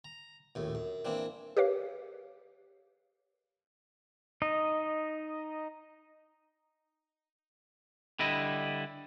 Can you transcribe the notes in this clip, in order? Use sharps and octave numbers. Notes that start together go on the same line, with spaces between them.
A#5
A#1 D#2 A2
F#2
E3 A#3 C4 D4
G4 A#4 B4 C#5 F5
D#4 D#5
D3 G3 E4 D#5